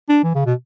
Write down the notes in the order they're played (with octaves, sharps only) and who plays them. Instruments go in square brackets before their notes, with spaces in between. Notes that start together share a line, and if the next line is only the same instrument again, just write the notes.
[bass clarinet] D4
E3
C#3
B2